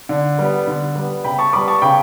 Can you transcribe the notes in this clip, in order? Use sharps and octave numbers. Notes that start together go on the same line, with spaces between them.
D3
G3 B3
D3
G3 B3
C#3 G5 B5
A5 C#6
G3 B3 B5 D6
A5 C#6
C#3 G5 B5